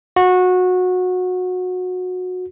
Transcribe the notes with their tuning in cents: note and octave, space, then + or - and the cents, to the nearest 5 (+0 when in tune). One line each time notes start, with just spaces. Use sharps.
F#4 -20